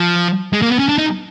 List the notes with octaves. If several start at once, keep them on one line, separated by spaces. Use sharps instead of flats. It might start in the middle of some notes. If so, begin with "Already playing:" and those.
Already playing: F3
G#3
A#3
B3
C#4
D4
D#4